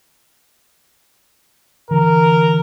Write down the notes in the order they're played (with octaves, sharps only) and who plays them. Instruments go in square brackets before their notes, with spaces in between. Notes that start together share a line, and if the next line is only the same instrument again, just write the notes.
[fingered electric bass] D3 E3 [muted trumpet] A#4